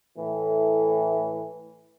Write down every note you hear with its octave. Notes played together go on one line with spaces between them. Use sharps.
A2 E3